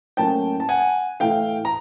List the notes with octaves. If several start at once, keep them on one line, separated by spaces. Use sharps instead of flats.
A2 F#3 A#3 C#4 G5 A5
A5
F#5 G#5
A2 E3 A3 F5 G5
A#5